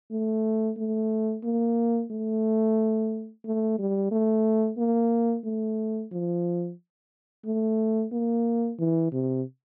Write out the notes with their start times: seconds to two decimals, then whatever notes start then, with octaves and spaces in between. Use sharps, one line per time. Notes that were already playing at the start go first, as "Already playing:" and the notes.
0.11 A3
0.77 A3
1.44 A#3
2.11 A3
3.45 A3
3.79 G3
4.12 A3
4.78 A#3
5.45 A3
6.12 F3
7.45 A3
8.12 A#3
8.79 E3
9.12 C3